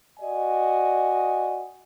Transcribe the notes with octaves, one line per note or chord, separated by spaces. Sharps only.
F#4 D5 D#5 G#5